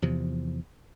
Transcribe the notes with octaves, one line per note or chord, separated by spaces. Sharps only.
E2 C3 F3